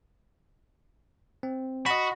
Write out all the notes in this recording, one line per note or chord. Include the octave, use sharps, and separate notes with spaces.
C4
F#4 D#5 B5